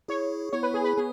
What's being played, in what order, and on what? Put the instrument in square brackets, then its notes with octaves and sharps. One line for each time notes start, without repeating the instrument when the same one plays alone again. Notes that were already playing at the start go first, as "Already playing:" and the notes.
[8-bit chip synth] E4 G#4 [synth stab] C#5
[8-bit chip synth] B3 E4 [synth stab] C#5
[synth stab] B4
G#4
B4
[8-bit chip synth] B3 [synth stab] G#4